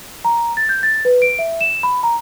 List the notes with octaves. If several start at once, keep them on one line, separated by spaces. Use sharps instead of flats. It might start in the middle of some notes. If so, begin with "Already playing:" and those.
A#5
A6
G6
A6
B4
D7
E5
E7
B5
A#5